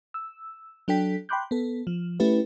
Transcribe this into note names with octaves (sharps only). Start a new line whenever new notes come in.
E6
F#3 D4 A4 G5 B6
G5 B5 C6 D6 F#6 G6
B3 A4
F3
A3 C#4 E4 G4 B4